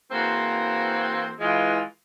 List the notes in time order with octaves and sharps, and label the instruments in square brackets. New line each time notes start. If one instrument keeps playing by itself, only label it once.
[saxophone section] E3 A#3 C4 F#4 G#4 C5
E3 G#3 F4